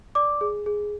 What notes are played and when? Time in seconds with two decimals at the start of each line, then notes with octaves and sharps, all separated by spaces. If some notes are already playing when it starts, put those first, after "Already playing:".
0.15 D5 D6
0.41 G#4
0.66 G#4